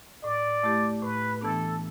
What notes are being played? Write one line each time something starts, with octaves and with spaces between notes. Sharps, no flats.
A2 D5
A3 E4 G4
A2 B4
E3 B3 D4 A4